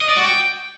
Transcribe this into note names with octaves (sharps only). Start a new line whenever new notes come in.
D#5
D5
F#4
G5